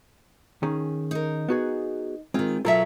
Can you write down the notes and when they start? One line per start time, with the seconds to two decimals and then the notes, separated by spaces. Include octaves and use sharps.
0.63 D#3 C#4 G#4
1.11 D#4 A#4
1.49 B3 F#4 G#4
2.34 D#3 G#3 C4 F4
2.65 B2 F#3 F4 A4 A#4 E5